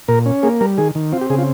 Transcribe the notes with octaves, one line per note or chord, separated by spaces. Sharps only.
A#2 A#4
C#4
A#3 G#4
G3 A#4
D#3 G#4
D#3
C4 F4
G4
C#3 G#4
F4